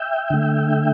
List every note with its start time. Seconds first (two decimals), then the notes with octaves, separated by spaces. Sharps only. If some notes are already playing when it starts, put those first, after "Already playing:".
Already playing: E5 G5
0.30 D3 A3